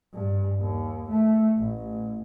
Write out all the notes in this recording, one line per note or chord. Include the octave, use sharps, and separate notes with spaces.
G2
D#2
A3
A1